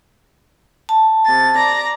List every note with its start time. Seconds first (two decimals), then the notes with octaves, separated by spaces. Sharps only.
0.89 A5
1.25 C3 A6
1.55 D5 A#5 A#6